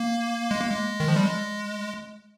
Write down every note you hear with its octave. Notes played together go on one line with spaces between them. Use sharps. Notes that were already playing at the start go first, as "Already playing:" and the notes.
Already playing: A#3
G#3
A#3
G#3
D#3
F3
G3
G#3